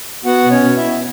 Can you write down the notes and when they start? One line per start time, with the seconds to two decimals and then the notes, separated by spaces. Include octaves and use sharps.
0.25 B3 F#4 F#5
0.44 B2
0.51 C#4 C#5
0.64 B2
0.77 E4 E5
0.84 B3